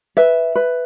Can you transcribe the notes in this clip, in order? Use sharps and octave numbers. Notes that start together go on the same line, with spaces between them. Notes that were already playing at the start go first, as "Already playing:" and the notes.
B4 E5
B4